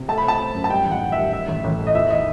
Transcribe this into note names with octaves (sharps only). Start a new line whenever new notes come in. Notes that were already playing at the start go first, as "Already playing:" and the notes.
Already playing: C3
A3 A5
B5
C4 A5
C4
F#2
A5
G3 G5
A1
F#5
D#3
G3 E5
D#3 E5
A1
A1
A3
D#5
E2 E5
D#3 D#5